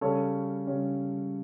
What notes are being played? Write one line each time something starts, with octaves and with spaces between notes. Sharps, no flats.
C#3 G3 C#4 A4 C#5
C#3 G3 C#4